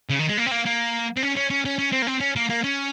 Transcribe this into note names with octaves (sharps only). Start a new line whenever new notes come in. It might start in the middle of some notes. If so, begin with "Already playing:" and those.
C#3
D#3
G#3
A#3
C4
A#3
A#3
C4
C#4
C#4
C#4
C#4
C#4
C4
A#3
C4
C#4
A#3
A#3
C#4